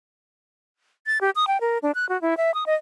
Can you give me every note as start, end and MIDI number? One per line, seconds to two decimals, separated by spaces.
1.06 1.18 93
1.21 1.30 67
1.36 1.45 87
1.47 1.60 79
1.61 1.78 70
1.82 1.91 62
1.95 2.08 90
2.09 2.20 66
2.22 2.37 64
2.37 2.54 76
2.54 2.64 87
2.66 2.74 75